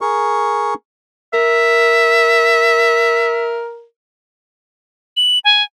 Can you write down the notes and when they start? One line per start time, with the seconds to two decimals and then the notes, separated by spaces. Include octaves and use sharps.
0.01 G#4 A#4 C#6
1.34 A#4 E5
5.17 F#7
5.44 G#5